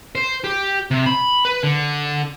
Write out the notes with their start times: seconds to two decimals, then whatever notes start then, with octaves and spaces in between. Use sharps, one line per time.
0.15 C5
0.44 G4
0.91 C3
1.06 B5
1.45 B4
1.63 D3